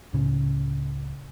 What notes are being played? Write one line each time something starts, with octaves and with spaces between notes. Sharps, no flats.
C#2 A2 C#3 C#4